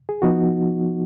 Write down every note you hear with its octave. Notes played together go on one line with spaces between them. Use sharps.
G#4
F3 B3 D#4 F#4